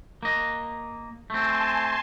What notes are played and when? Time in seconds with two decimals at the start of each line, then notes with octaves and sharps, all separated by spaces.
0.23 A#3 D#5
1.30 A3 C4 G#5 A5 C6